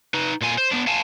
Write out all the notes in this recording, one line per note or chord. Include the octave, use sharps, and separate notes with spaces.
D#4 B4
A#2 F4 G#5
C5
B3 D4
F5 G#5 A5